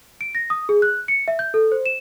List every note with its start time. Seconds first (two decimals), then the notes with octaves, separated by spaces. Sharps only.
0.21 D7
0.35 A#6
0.50 D#6
0.69 G#4
0.82 F#6
1.08 C#7
1.28 E5
1.39 G6
1.54 A4
1.72 C5
1.86 E7